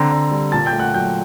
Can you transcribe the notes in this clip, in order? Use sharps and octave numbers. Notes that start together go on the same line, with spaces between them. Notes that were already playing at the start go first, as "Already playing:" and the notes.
Already playing: D3 C4 A#5 A#6
D3
G3
A#2 A5 A6
G5 G6
A3
F#5 F#6
F#3 G5 G6